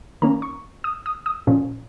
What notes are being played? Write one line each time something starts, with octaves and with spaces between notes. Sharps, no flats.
D#3 A#3 C#4 A#5
C#6
D#6
D#6
D#6
A#2 F3 C#4